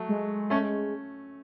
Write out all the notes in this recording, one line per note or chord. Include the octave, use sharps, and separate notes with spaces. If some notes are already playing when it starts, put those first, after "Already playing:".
Already playing: F#3 A3
G#3
A3 C#4